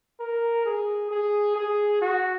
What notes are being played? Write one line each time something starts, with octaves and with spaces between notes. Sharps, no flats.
A#4
G#4
G#4
G#4
F#4